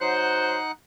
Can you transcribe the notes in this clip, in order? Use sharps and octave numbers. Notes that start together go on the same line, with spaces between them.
F#3 D#4 C5 F#5 F#6